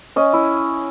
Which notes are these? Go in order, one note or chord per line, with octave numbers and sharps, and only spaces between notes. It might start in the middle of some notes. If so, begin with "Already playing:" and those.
C#4 D#5
E4